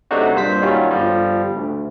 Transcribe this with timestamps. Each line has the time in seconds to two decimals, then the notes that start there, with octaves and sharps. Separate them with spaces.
0.11 C3 F#3 A3 D4 D#4 F#4
0.34 G2 A#2 C5 B6
0.62 D#3 F#3 G3 C#4 F4
0.91 G1 F3 G3
1.56 D2